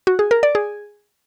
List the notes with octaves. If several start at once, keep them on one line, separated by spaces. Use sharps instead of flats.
F#4
G#4
A#4
D5
G#4